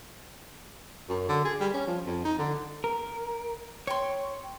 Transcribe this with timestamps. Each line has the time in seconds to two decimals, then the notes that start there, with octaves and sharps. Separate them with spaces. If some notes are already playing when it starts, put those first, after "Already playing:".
1.09 F#2
1.28 D3
1.45 G#4
1.60 G3
1.74 C#4
1.87 F3
2.06 F2
2.25 D#4
2.39 D3
2.84 A#4
3.87 C#5 G5 C6